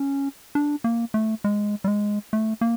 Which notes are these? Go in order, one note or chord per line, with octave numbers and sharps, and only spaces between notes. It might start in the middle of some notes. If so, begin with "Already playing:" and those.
Already playing: C#4
D4
A#3
A3
G#3
G3
G#3
A3
A#3